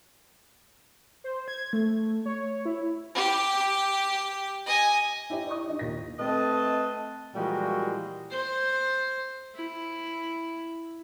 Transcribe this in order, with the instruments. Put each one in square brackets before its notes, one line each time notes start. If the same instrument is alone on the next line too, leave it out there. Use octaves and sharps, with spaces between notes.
[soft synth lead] C5
G#6
A3
C#5
E4
[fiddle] G4
D#5 G#5
[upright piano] E4 G4 C#5 D#5 E5
D5 C#6 D#6
D4 D#4 D#5
D#2 A#2 A#6
[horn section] A3 C4 B4 D#5 A5
A#2 E3 F3 G3 G#3 F#4
[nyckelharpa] C5
E4